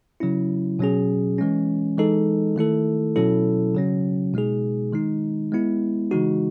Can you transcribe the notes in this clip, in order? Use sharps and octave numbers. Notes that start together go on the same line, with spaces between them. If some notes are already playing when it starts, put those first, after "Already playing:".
C#3 F#3 C#4 E4
B2 F#3 C#4 G#4
E3 G#3 C#4
E3 G#3 D#4 A4
D#3 A3 E4 A4
B2 F#3 C#4 E4 A4
C#3 F#3 C#4
B2 G#3 D#4 G#4
D#3 G#3 D#4
G#3 B3 E4
C#3 E3 G#3 D#4 F#4